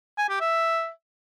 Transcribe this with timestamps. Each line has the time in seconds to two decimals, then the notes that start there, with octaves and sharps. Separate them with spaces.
0.18 G#5
0.29 G4
0.40 E5